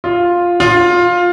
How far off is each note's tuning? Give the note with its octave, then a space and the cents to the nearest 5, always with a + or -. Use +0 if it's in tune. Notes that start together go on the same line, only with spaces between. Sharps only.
F4 +5
F4 +15